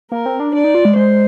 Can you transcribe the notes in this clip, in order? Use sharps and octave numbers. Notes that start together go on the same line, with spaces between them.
A#3 A#4
C4
D4
D4 D5
D#4
F4
G#3
G#3 C5